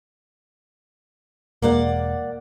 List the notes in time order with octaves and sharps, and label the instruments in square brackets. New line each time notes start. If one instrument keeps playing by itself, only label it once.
[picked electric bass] E1 G#3 [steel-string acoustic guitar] A#3 D5 F#5